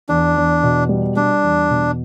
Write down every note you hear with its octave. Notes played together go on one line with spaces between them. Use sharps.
E2 D4
E2
B2
G3
G3 D4
E2
B2